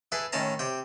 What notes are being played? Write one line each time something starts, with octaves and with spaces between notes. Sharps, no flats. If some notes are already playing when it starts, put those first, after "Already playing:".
E4 G#4 A4 B4
A2 D#3 C#4 A5 A#5
C3 G5